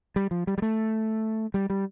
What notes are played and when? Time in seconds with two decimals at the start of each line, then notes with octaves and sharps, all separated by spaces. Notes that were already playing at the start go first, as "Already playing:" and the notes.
0.16 G3
0.31 F3
0.47 G3
0.58 G3
0.62 A3
1.54 G3
1.70 G3